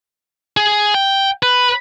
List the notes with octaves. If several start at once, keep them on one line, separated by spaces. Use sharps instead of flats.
G#4
G5
B4